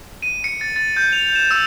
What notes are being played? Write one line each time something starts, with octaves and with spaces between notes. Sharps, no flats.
D#7
C#7
A6
A6
G6
F7
E7
E6